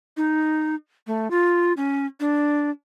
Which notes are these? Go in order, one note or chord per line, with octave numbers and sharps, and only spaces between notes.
D#4
A3
F4
C#4
D4